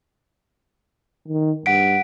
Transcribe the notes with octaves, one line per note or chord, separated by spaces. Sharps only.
D#3
G2 F#5 B6 D7